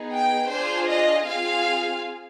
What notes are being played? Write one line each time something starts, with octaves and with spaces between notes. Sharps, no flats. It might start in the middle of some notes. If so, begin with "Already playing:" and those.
Already playing: B3 D#4 G#4
G5
D4 F4 G#4 C5
D#5
C4 F4 G#4 F5